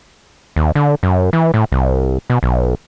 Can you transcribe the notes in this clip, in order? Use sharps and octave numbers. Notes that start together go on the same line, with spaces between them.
D#2
D3
F#2
E3
A2
C2
B2
B1